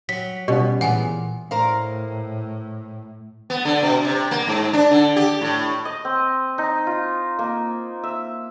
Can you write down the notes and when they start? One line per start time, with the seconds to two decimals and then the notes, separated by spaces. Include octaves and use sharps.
0.09 F#3 B6
0.48 B2 G3 B3 C#4 F4
0.81 A#2 E3 B3 G#4 F#5 G#5
1.51 A2 A#4 C5 F5
3.50 B3
3.65 D3
3.83 B2
4.05 C3
4.31 A#3
4.48 G#2
4.73 D4
4.91 D3
5.16 G4
5.41 A2
5.85 D#5
6.05 C4
6.58 D#4
6.87 F4
7.39 A#3
8.03 E5